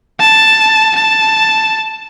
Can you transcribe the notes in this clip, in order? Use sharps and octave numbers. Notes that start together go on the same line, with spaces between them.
A5
A5